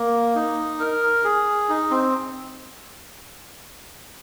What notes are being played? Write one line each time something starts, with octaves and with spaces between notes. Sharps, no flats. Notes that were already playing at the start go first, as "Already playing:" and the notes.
Already playing: A#3
D#4
A#4
G#4
D#4
C4